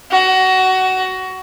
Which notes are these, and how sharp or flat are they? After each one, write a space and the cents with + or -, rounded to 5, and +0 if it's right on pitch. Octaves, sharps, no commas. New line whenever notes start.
F#4 +20